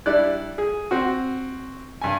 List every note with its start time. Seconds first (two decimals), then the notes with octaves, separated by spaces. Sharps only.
0.06 G3 D4 E4 D5 F#6
0.58 G#4
0.91 C4 F#4
2.01 G2 G#5